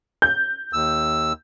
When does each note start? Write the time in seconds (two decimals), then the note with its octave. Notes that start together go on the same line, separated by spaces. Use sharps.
0.22 G6
0.73 D#2 E6